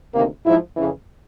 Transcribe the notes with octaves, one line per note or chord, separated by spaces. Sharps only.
D2 C3 D#3 A#3
G#2 F3 E4
F2 C#3 E3